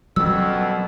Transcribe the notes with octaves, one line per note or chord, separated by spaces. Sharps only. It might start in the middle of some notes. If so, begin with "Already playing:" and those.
F2 B2 F#3 G3 C#4 E6